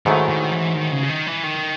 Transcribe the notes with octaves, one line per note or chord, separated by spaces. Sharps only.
G#2 D#3 F#3 A3 E4
D#3
E3
D#3
C#3
D#3
E3
D#3